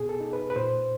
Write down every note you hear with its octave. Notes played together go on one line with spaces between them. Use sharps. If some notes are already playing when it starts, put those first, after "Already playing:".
Already playing: B2 G#4
A4
D#4
B4
B4
A#2 C5